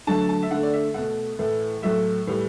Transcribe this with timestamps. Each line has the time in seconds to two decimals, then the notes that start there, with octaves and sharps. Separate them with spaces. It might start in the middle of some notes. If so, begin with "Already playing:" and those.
0.07 D3 F#3 A3 A5
0.29 A5
0.43 E5
0.51 D3 A3 F#5
0.63 D5
0.73 E5
0.94 B2 A3 F#5
1.39 A2 E3 A3
1.82 A2 F#3 A3 E5
2.27 A2 E3 G3